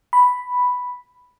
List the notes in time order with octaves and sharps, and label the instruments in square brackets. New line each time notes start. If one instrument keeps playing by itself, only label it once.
[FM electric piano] B5